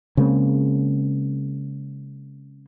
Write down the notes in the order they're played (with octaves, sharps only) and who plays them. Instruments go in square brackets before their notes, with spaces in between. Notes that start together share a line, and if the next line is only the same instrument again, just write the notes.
[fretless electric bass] C#3 G#3 A#3 C4